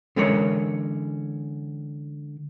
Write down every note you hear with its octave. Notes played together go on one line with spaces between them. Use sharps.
D3 E3 G#3 C#4 A#4 C#5